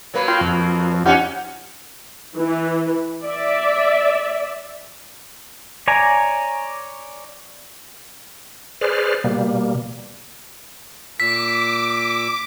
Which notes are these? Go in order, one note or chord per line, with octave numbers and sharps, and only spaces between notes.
F#3 A#3 B4
F4 G5 C6
F2
C#4 D#4 F4 G4 F#5
E3
D5 E5
C#5 D5 G#5 A#5
G#4 B4 C5 D5 F6
B2 G3 A#3
A#2 D6 E6 B6